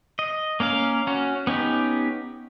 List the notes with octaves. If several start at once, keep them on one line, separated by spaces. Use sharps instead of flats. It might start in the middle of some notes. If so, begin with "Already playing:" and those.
D#5
A#3 C#4 A#4 F5
C#4 F#4
B3 C#4 D#4 G4